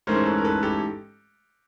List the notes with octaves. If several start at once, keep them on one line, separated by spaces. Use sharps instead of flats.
G#2 E3 A3 C#4 A#4 C5
A4 B4
A#4
A4 B4
G4 A4